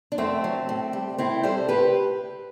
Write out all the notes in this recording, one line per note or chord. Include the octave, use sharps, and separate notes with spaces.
D4
F#2 A3 C4
F#3
A2
G3
A2 C4 E4
G3 A4 C5
A2 G4 B4